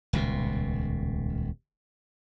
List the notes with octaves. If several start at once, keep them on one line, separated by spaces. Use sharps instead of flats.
D#1 C#2 B2